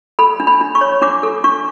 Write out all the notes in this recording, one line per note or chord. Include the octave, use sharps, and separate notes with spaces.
A4 B5
D4
B5
D4
C#6
C#5
D4 D6
A4
D4 C#6